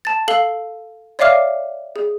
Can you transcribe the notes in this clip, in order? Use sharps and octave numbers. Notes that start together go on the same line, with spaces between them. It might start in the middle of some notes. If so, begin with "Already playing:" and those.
A5 A6
A4 F5 F#7 G7
C#5 D5 E5 F5 D6 F6
G#4